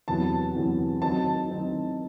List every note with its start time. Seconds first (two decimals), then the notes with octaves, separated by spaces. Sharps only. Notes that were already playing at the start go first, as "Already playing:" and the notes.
0.08 E2 C3 F#3 B3 A5
0.55 E2 C3 F#3 B3
1.01 D#3 F#3 C4 D#4 A5
1.48 D#3 F#3 C4 D#4